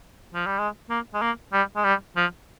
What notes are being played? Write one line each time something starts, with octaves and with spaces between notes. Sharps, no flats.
F3
G3
G#3
A#3
G#3
A#3
G3
G#3
G3
F3